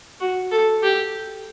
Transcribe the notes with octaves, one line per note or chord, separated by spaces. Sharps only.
F#4
A4
G4